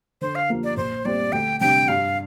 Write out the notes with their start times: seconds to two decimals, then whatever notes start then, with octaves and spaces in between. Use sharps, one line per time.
0.21 D3 C5
0.35 F5
0.50 F3 A#3 G4
0.64 D5
0.77 A#1 C5
1.05 A#2 G3 C4 D5
1.32 D2 G5
1.60 C3 G3 D4 G4 G5
1.88 G2 F5